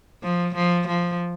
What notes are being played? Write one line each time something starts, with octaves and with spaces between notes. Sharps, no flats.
F3
F3
F3